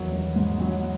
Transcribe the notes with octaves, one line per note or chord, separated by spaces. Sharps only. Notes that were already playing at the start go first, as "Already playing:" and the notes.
Already playing: E2 D#3 F#3
F#3
G#2
F#3